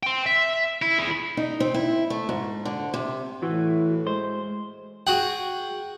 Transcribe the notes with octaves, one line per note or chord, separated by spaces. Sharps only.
G5 C6
E5
E4
E4 G#4
D#4
C4
E4
A3
G#2
D3
C3
A2 E3 F#4
G#3 C5
F#4 G#4 F#5 G5